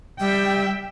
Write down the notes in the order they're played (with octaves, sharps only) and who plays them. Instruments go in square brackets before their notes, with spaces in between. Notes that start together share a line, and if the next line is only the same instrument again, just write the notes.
[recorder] G3 [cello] E5 G5